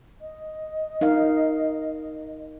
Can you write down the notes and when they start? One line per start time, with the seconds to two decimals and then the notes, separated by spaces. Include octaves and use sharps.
0.21 D#5
1.01 D#4 A#4 F5